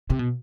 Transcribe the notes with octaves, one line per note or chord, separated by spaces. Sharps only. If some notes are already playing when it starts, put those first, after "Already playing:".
C3
B2